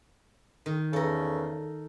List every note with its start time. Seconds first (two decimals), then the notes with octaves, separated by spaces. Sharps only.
0.66 D#3
0.93 E2 C#3 A4 A#4